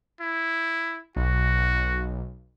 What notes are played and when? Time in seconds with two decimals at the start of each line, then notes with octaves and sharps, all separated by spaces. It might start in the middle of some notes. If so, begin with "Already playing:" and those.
0.20 E4
1.16 B1 F#4